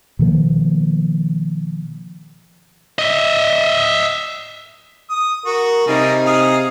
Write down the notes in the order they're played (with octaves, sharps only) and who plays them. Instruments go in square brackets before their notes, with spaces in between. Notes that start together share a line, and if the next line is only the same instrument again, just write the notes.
[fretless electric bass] B2 D#3 F3 A#3
[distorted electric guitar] D#5 E5
[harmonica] D#6
[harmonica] F#4 [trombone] A#4
[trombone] C3 [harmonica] G3 A#3 G#4 [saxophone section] D#4
[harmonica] G#4 F5 D#6